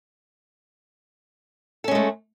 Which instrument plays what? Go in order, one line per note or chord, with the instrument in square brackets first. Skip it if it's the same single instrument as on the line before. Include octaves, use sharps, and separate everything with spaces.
[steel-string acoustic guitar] A4
C#4
G#3
A3